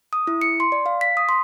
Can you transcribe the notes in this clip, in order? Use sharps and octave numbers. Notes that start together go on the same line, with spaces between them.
D#6
E4
C#7
C6
D5
F5
B6
D#6
C6